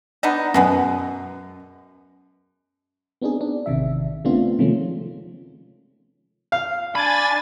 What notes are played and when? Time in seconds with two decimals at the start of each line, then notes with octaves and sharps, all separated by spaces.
0.23 B3 D4 D#4
0.54 F#2 B2 G#3 B3
3.22 B3 C4 D4 D#4 G#4
3.41 D4
3.66 A1 C3 D#3 E5
4.25 C#3 A3 B3 C4 D4 F4
4.59 C3 D#3 F3 G#3 A3 C#4
6.52 F5
6.95 D4 G#5 B5 A6